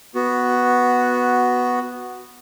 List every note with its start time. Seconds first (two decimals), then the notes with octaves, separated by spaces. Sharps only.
0.15 B3 F#4